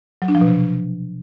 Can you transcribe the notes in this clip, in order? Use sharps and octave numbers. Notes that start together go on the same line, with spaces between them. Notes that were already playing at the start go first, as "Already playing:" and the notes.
F#3
D4
F3
B2
C3